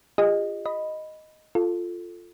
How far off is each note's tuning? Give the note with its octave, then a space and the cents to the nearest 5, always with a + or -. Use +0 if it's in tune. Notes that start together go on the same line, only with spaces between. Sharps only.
F4 +0 G#4 -45 D#5 -10
D#5 +0 B5 +0
F4 +0 A4 +0